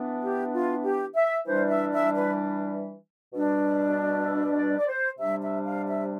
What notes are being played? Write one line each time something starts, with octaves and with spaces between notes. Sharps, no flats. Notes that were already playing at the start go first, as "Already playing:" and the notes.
Already playing: E3 B3 D4
G4
F4
G4
E5
E3 G3 D4 C5
E5
E5
B4
B2 G3 D4
E5
D5
D5
C5
C3 G3 D4 E5
E5
F5
E5